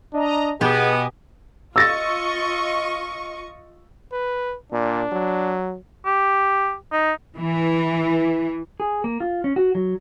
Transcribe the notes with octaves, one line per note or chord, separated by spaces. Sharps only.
D4 D#5 A#5
B2 B3 G4 G#4 D#5 G#5 D6
F4 D#5 C#6 E6 A6 A#6
B4
A#2 D4
F#3
G4
D#4
E3
G#4
A#3
F4
C#4
F#4
F#3